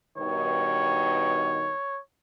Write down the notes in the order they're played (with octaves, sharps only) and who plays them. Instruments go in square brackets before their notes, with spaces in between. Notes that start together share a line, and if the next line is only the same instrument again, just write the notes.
[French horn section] G2 B2 D#3 [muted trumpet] C#5